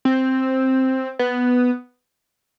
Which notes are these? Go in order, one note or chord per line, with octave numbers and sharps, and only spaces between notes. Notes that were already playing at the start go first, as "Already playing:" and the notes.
C4
B3